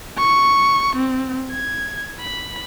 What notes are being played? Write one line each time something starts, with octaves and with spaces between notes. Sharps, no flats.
C#6
C4
G#6
B5